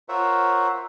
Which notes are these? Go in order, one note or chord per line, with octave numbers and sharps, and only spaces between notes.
F4 A#4 C5 C#5 E5 F#5